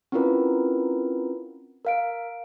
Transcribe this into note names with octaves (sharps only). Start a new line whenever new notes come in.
C4 C#4 E4 F4 A#4 B4
A#4 F5 D7